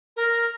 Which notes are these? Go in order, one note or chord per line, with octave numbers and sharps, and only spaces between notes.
A#4